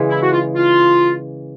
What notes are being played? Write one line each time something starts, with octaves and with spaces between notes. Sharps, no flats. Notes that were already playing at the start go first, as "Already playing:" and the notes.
Already playing: C#3 E3 G#3
E4
F#4
F4
F4